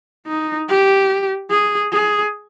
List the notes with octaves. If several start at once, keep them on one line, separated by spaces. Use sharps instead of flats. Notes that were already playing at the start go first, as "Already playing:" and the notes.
D#4
G4
G#4
G#4